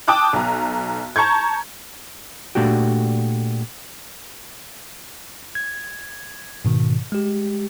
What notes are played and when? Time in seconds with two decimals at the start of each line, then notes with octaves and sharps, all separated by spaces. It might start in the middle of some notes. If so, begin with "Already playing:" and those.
0.08 G5 A5 D6 D#6 F#6
0.33 B1 A#5
1.16 A5 A#5 C#6 G6 G#6
2.55 A#2 A3 D4 F#4 G4
5.55 G#6
6.65 G#2 B2 D#3
7.12 G#3 G4